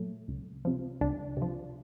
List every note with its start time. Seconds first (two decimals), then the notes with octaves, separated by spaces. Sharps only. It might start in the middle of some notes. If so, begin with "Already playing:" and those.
Already playing: A#2 F#3 A3
0.28 C#2
0.65 C3 F3
1.01 C#2 D4
1.37 C3 F3